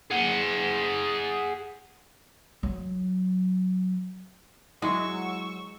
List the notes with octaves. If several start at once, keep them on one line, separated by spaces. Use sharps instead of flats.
G#4 F#5
F#3
F#3 G#3 E4 C#6 E6